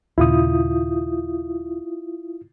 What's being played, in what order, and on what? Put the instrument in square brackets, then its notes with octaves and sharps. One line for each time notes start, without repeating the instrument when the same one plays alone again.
[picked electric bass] D#2 A#2 C#3 [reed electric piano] E4 F4 D#6